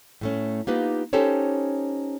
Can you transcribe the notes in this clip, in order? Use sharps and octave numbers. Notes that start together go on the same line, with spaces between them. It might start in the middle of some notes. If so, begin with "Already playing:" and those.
A2 A3 C#4
A#3 B3 D#4 F4 G4 B4
C#4 D#4 G4 A4 C5 C#5